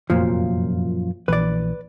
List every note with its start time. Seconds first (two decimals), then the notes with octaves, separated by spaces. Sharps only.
0.10 F1 F#2 A#2 F3
1.28 A#1 E3 B4 D5